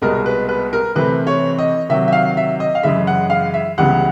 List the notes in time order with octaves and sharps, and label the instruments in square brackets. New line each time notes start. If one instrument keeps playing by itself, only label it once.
[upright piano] C2 B2 G#3 B3 A#4
B4
B4
A#4
C3 E3 A3 C4 B4
C#5
D#5
C3 D#3 F#3 E5
E5
F5
E5
D#5
F5
F#2 C#3 E3 G#3 E5
F#5
F5
E5
C#2 C#3 E3 G3 B3 F#5